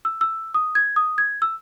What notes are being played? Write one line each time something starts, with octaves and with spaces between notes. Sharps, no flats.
E6
E6
D#6
G#6
D#6
G#6
E6